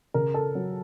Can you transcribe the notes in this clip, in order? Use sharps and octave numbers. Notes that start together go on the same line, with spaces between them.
C#3 A#4
A4
F#3